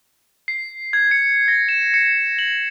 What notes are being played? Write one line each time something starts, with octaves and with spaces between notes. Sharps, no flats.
C7
G#6
C#7
A#6
E7
C#7
F#7